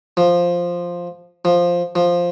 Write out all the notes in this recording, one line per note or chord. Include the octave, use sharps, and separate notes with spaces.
F3
F3
F3